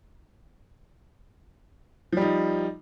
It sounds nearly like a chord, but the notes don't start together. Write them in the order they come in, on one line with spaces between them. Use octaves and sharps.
F3 G3 D#4